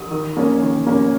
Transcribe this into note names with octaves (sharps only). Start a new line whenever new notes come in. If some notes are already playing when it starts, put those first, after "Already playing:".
Already playing: D#6
D#3
A#3 C#4
D#3
A#3 C#4